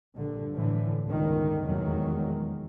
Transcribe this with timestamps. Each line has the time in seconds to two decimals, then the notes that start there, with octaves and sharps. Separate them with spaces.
0.15 A#1 G2 D3
0.53 A2 D3 E3 F3
1.06 G1 C#2 D3 D#3
1.63 F1 E2 A#2 D#3 F#3 G#3